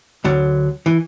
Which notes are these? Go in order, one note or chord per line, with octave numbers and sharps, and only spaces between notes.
D2 D3 F#3
E3